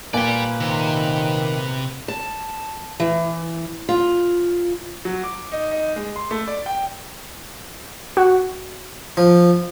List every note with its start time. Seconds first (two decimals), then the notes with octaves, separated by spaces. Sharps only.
0.14 A#2 A#3 B4 D5 G5 G#5
0.60 C3 D#3
2.08 A5
3.00 E3
3.89 F4
5.05 F#3
5.24 D6
5.52 D#4
5.71 D#4
5.96 G#3
6.16 C6
6.31 A3
6.48 D5
6.66 G5
8.17 F#4
9.17 F3